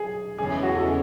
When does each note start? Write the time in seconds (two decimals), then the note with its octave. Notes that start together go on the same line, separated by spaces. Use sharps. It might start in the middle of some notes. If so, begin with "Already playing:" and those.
Already playing: G#4
0.38 E2 C#3 E3 G#3 C#4 G#4
0.50 G#4
0.63 F#4
0.74 F#4 A4
0.87 G#4